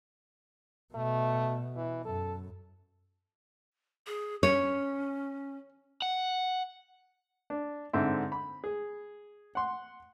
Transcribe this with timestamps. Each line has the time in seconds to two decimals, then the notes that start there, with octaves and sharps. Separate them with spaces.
0.95 B2 A3
1.76 E3
2.05 F#2 A4
4.07 G#4
4.43 C#4 C#5
6.02 F#5
7.50 D4
7.93 G#2 D3 C4 E5
8.32 B5
8.64 G#4
9.55 F#5 C6